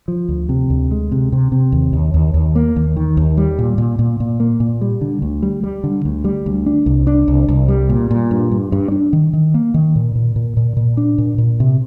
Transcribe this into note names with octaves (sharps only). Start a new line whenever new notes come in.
F3
D2
C3
D2
G#3
C3
C3
C3
D#2
D#2
D#2
D#2
A#3
D#2
D#3
D#2
G3
A#2
A#2
A#2
A#2
A#3
A#2
G3
D3
D2
G3
G3
D3
D2
G3
D2
D4
C2
D4
C2
C2
G3
A#2
A#2
G2
G2
G2
D4
D#3
D#3
A#3
D#3
A#2
A#2
A#2
A#2
A#2
D4
A#2
A#2
C3